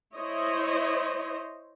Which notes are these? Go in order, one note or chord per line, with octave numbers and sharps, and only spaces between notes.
E4 C5 C#5 D#5